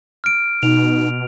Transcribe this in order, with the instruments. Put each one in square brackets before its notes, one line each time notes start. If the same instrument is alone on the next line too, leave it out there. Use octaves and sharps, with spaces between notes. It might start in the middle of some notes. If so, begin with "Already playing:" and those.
[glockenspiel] F6 D7
[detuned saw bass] B2 [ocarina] D#4 [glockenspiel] F7